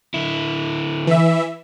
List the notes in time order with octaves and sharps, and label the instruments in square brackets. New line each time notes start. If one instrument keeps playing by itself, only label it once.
[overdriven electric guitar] D3 E4
[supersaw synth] E3 E5